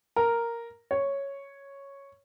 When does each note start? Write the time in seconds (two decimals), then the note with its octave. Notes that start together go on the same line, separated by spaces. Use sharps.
0.16 A#4
0.91 C#5